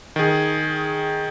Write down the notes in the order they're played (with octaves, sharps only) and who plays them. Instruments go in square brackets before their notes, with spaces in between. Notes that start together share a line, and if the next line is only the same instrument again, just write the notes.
[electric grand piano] D#3 G#4